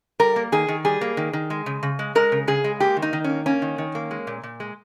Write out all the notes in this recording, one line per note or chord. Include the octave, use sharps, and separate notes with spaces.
G3 A#4
A#3
D#3 G#4
D#3
G3 G#4
A#3
D#3
D#3
G#3
C#3
C#3
G#3
G#3 A#4
C#3
C#3 G#4
G#3
A#3 G4
D#3
D#4
D#3
A#3 C#4
A#3 C#4
D#3
D#3
A#3
G#3
A#2
A#2
G#3